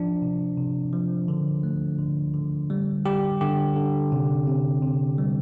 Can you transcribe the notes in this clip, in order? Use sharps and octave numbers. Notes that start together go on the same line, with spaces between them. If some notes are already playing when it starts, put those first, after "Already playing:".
Already playing: F3 D4
C3
C3
F3
D3
A3
D3
D3
G3
G3 G4
D3 G4
D3
C3
C3
C3
G3